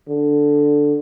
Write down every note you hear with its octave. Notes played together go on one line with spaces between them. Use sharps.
D3